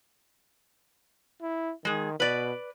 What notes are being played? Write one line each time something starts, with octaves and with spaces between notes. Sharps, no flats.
E4
D#3 G#3 G#4
B2 B4 D5